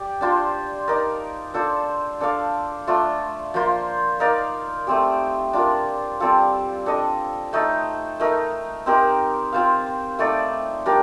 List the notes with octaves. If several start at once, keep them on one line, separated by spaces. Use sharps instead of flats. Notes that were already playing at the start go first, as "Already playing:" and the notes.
Already playing: G4 D5
D4 F4 C5
D#4 A#4 D5
D4 F4 A4 C5
D4 A4 D5 F5
A3 D4 F4
F3 A#3 F4 C5
D#4 A#4 D5 F5
A3 C4 G4
D4 F4 A#4
G3 C4 F4 A4
D4 A4 D#5
A3 D#4 A4
A3 D#4 A#4
C4 D#4 G4 A#4
C4 F4 C5 F5
A3 D#4 A4 D5
G3 D4 G4 A#4